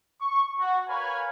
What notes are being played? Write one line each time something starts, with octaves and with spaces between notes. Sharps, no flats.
C#6
F#4
A#4 B4 C#5 F5 G#5 B5